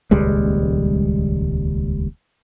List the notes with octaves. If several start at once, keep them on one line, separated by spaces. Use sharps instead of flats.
D#1 C#2 G3 G#3